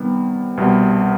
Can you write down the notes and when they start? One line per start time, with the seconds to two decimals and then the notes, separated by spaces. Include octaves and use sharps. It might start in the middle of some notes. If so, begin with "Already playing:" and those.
Already playing: C3 D#3 G3 B3
0.57 C2 B2 G3